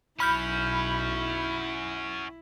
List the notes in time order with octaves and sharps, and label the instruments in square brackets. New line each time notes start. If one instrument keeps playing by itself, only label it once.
[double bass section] B1 [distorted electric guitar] C#4 F#4 [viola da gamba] E4 [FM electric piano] B5 F6 G6